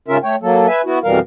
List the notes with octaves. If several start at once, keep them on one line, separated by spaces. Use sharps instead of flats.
G#2 C#3 C#4 F4 A#4 E5
A3 C#5 G5
F#3 A#3 A4
B4 E5 G#5
B3 E4 F#4
F2 B2 E3 G3 A#4 F5